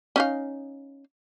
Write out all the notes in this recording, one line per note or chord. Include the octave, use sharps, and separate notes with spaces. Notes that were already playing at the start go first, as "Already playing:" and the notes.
C#4 D#4 F5